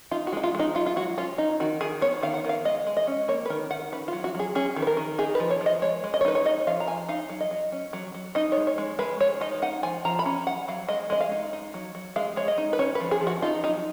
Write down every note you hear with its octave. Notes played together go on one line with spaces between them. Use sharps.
D#4 F4
F#4
G#3 D#4
F4
G#3 D#4
F#3 F4
F4
F#3 F#4
C#4 F4
D#4
D#3 F#4
D#3 G#4
B3 C#5
D#3 F5
F#5
D#3 F5
G#3 D#5
G#3
D#5
C#4
A#3 C#5
B4
D#3 A#4
D#3 F#5
C#4 B4
F4
F#3
F#4
F#3 G#4
C#4 G#4
D#3
B4
A#4
D#3
D#4 G#4
B4
F3
C#5
F3
D#5
G#3 C#5
G#3
D#5
C#5
D#4 B4
C#5
D#4 D#5
F3 F5
A#5
F3 G#5
D#4 F5
F#3
D#5
F#3
C#4
F#3
F#3
D#4 D#5
C#5
G#3
C#5
G#3
G#3 B4
G#3 C#5
D#4 D#5
D#4 F#5
F3 G#5
F3 A#5
B5
C#4 A#5
F#3 F#5
F#3 F5
G#3 D#5
G#3 D#5
F5
D#4
D#4
F#3
F#3
G#3 F5
G#3 C#5
D#5
D#4
B4
C#4 C#5
B4
F3
G#4
F3
F#4
D#4 F4
F#3 D#4